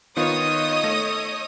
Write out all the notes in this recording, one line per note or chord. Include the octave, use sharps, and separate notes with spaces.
D#3 B3 F4 C#5 D#5 D#6
A3 A#6